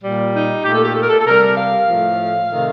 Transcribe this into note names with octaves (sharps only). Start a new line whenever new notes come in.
A#2 G3
D#4
A#2 A3 G4
A4
G4
A4
A#4
A4
A4
C3 G3 A#4
F5
A2 F3 A3
C3 D#3 A3